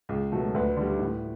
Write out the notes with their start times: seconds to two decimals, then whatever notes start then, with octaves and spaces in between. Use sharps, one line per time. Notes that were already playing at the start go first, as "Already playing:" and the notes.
0.09 C#2
0.32 B2 F#3 A3
0.54 D2 B4
0.77 D3 G3
0.99 A2